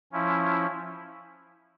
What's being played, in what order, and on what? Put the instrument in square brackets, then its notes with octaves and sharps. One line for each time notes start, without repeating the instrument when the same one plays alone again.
[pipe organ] F3 C#4 E4